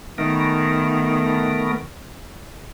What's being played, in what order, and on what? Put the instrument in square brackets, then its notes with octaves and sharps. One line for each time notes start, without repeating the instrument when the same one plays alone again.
[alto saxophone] D#3 [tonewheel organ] A3 B3 A#4